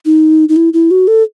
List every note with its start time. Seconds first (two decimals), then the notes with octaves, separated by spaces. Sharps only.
0.05 D#4
0.49 D#4
0.56 E4
0.73 E4
0.91 F#4
1.08 A4